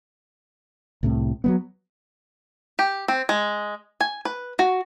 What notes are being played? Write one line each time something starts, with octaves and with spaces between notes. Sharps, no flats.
C2 A2 C3
F#3 G3 B3
G4
C4
G#3
G#5
B4
F#4